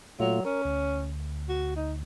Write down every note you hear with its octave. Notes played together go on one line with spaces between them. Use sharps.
A#2 F#3 A3 F4
C#4 A#4
D2
F#4
D#4